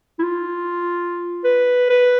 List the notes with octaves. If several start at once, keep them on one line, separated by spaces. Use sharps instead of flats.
E4
F4
B4
B4